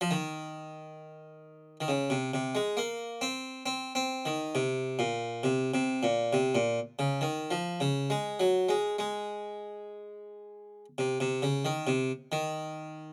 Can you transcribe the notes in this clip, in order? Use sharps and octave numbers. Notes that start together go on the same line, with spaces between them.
F3
D#3
D#3
C#3
C3
C3
G#3
A#3
C4
C4
C4
D#3
C3
A#2
C3
C3
A#2
C3
A#2
C#3
D#3
F3
C#3
G#3
F#3
G#3
G#3
C3
C3
C#3
D#3
C3
D#3